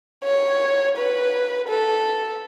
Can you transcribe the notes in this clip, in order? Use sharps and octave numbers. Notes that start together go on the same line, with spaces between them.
C#5
B4
A4